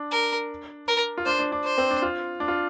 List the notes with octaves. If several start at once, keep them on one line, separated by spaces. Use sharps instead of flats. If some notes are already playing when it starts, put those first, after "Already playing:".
Already playing: D4
A#4
A#4
F4
D4 C5
D4
D4
C5
C4
D4
F4
D4
F4